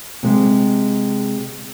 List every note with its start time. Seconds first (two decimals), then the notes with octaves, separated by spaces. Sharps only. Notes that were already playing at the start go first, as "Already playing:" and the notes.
0.23 C3 G#3